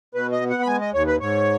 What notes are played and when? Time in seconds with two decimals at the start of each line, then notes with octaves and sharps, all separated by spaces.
0.14 B2 B4
0.32 D#5
0.41 B3
0.50 F#5
0.62 B5
0.67 G#3 G#5
0.81 D#5
0.93 D#2 C#5
1.07 B4
1.20 G#2 C#5